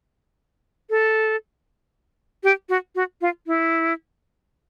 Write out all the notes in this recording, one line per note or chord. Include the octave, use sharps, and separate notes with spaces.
A4
G4
F#4
F#4
F4
E4